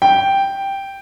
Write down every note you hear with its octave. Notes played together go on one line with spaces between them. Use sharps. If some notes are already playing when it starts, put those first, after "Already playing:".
G5